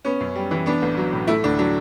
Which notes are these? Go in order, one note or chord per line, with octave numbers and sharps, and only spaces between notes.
B3 C#4
F#2
G3
E3
B3 D4
A1
F#3
A2
A3 E4
D2 D4
F#3 D4